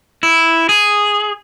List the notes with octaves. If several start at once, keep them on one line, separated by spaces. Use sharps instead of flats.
E4
G#4